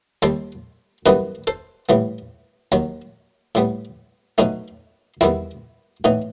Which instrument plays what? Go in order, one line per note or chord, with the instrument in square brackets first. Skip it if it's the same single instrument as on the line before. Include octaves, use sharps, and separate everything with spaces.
[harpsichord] D#2 D#3 G3 A4 C5
F#2 E3 G3 B3 B4 D#5
A4 C5
A2 E3 G3 B3
D#2 D#3 F#3
A2 G3 B3
B2 F#3 A3 B3 D#4
E2 D#3 G3 B3 C4 E4
A2 E3 B3 D#4